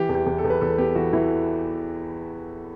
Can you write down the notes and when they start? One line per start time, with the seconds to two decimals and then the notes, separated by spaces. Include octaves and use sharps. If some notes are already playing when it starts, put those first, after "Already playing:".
Already playing: E3 G4
0.09 E2
0.15 G4
0.26 E2
0.38 A4
0.44 E2
0.50 B4
0.61 E2 A4
0.78 B3 G4
0.95 E3 F#4
1.13 E3 E4